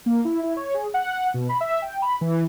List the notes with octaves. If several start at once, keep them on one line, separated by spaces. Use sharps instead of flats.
A#3
E4
E4
C#5
G#4
F#5
B2
B5
E5
G5
B5
E3